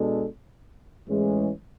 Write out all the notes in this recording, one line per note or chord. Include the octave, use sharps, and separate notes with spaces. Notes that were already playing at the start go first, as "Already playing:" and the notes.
Already playing: B2 G#3 D4 A4
A2 E3 G#3 C#4 G#4